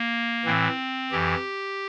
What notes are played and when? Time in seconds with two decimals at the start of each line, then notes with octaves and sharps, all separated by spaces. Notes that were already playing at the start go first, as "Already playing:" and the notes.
Already playing: A#3
0.45 A2 E3 C4
1.11 F2 E3 G4